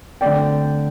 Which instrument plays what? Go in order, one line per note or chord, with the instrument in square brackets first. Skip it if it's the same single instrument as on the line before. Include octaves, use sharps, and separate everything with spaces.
[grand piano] D3 A3 C4 D5 G5